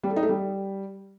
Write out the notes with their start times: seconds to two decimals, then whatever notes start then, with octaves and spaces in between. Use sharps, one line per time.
0.03 G3
0.10 A4
0.16 D#4
0.23 A3
0.29 G3